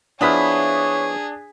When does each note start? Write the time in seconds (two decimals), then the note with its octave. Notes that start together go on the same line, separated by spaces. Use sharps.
0.21 F3 B3 D4 E4 G#4 C#5 D#6 B6